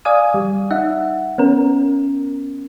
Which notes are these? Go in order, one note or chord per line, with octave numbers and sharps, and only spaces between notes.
D5 F5 G#5 D#6
G3
D#4 E5 F#5
B3 C#4 A#4